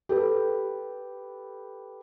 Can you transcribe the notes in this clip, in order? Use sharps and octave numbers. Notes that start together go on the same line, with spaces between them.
G4 A4 B4